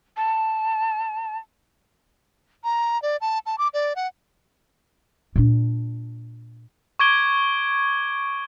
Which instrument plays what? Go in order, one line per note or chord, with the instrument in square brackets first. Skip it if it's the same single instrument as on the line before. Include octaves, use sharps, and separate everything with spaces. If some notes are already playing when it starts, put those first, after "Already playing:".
[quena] A5
[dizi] A#5
D5
A5
A5
D6
D5
F#5
[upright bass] A#2 D4
[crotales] C#6 D6 G#6 D7 G7